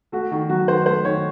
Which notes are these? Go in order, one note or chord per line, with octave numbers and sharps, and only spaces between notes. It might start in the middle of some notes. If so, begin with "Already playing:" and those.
A3 F#4
D#3 F#4
F#3 F#4
D#3 C5
A3 C5
D#3 C#5